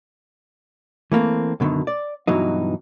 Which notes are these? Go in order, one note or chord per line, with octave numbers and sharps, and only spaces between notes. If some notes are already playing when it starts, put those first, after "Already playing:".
E3 A3 A#3 C4
F#2 B2 D3 D#3
D5
G2 B2 E3 F#3 D#4